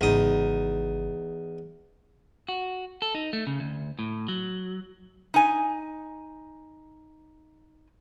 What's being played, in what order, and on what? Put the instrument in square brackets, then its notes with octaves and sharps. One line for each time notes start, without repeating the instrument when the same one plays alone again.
[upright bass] G#1 C#3 [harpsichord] E2 D#4
[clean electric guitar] F#4
A4
D#4
A3
C#3
D2
A2
F#3
[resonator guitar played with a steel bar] D#4 G#5